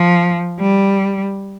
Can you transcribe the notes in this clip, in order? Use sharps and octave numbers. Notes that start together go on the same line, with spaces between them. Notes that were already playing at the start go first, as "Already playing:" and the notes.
Already playing: F3
G3